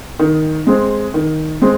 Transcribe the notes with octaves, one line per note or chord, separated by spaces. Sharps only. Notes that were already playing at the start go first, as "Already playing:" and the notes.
D#3
G#3 C4
D#3
G#3 C4